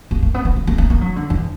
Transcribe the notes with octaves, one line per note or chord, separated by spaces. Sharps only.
A#3
A#3
B3
B3
A#3
A#3
A#3
A#3
F#3
D3
E2